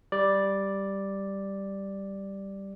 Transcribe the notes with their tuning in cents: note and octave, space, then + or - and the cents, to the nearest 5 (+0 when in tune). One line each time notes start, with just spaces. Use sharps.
G3 +0 D5 +0